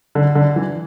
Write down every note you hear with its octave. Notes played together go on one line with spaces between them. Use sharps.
D3
D3
E3